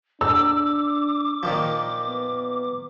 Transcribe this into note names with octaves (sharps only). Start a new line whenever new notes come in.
D4 D6 E6
A#2 D#3 F3
B3